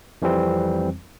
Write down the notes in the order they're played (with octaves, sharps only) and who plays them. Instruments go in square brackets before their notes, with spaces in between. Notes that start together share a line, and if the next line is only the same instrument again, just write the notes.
[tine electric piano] F2 E3 G3 C4